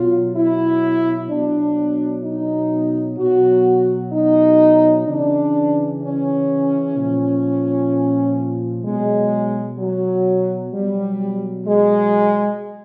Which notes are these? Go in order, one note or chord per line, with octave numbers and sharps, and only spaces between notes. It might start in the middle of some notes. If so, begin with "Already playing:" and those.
Already playing: B2 F#3 F4
E4
B2 F#3 D4
D#4
B2 F#3 F#4
D#4
C#3 E3 D4
C#4
A#2 F3
B2 F#3 G#3
F#3
B2 F#3 G3
G#3